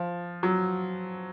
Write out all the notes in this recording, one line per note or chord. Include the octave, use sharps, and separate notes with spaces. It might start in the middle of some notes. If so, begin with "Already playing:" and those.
Already playing: F3
F#3